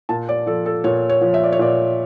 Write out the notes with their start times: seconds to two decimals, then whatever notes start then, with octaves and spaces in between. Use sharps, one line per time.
0.09 A#2 A5
0.29 D5
0.46 F3 A4
0.66 A4
0.84 A#2 C#5
1.09 C#5
1.21 F3
1.34 E5
1.43 D5
1.52 C#5
1.59 A#2 D5